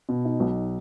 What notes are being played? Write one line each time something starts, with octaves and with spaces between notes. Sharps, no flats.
B2
D#4
B1